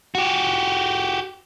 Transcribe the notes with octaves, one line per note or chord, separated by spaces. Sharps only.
F#4 G4